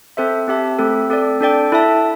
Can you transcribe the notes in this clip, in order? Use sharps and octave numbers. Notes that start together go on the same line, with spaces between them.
C4 A4 C5 E5
C4 G4 E5 A5
A3 C4 A4
C4 A4 D5
D4 A4 D5 G5
E4 A4 E5 A5